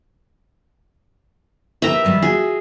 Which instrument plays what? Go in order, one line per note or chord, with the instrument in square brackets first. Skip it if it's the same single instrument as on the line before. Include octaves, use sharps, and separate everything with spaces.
[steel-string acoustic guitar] G4 A#4 B4 [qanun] E5 A#5
[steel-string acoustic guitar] D#3 G3 B3
[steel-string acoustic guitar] F4 F#4 [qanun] G#4